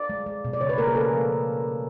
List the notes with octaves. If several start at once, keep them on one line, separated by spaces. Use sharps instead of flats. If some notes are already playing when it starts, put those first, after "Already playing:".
Already playing: D5
G#3
G#3
B2
D5
C#3 C#5
B4
A#3 A#4
G#4
C#3 A4
F3